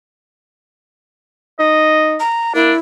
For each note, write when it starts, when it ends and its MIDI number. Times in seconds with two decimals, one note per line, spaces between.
1.60 2.18 63
1.60 2.21 75
2.20 2.53 82
2.55 2.73 58
2.55 2.73 62
2.55 2.79 64